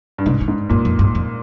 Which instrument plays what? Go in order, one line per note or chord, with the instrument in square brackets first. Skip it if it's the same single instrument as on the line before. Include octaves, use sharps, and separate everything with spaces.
[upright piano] G2
[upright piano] G#2 [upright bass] C3
[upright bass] D3
[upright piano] G#2
[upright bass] G2 [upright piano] A#2
[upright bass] F2
G2
F2